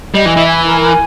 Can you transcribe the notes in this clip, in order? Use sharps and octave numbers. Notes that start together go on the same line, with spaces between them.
G3 D#5
E3
E4
E3
G#5
A#4
G#5